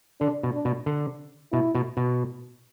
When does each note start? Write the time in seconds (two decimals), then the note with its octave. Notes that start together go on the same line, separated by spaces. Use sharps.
0.21 D3 D4
0.43 B2
0.54 D4
0.65 B2
0.86 D3
1.52 B2 E4
1.75 B2
1.97 B2